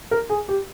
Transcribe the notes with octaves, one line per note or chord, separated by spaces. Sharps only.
A#4
G#4
G4